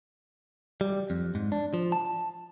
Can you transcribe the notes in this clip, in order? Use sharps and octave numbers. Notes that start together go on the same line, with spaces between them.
G3
F2
G#2
D4
F3
A5